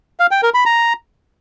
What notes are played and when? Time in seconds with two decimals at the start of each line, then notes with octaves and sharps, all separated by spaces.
0.20 F5
0.31 G5
0.43 A#4
0.54 B5
0.66 A#5